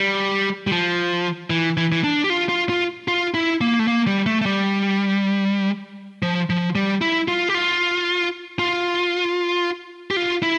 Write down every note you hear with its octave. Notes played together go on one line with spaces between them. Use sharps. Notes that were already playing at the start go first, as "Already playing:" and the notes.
Already playing: G3
G3
F3
E3
E3
E3
D4
G4
F4
F4
F4
F4
E4
A#3
A3
A#3
G3
A3
A3
G3
F3
F3
G3
E4
F4
G4
F4
F4
G4
F4
E4